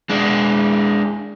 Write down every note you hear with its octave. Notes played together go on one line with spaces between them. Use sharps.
G#3 D4